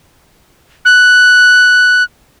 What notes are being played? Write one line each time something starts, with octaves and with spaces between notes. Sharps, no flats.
F#6